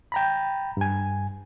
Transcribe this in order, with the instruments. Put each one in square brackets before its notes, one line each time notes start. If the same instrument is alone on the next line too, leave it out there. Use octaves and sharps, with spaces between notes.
[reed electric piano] G5 A#5 B5
G2 G#5